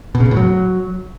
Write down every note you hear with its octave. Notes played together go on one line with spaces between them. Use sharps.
B2
C#3
B2
A2
F#3